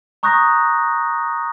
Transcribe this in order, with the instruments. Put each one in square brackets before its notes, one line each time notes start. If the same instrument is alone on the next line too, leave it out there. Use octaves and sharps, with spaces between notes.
[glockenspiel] A#5 C#6 D#6 F#6 G6 A#6